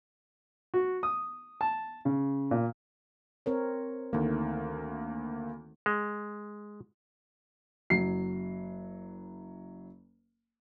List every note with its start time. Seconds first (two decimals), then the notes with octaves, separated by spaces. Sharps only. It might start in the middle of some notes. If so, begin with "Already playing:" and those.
0.74 F#4
1.03 D#6
1.61 A5
2.05 C#3
2.51 A#2
3.46 C4 A#4 C#5
4.13 D2 D#3 A3 A#3
5.86 G#3
7.90 F#1 F#3 C7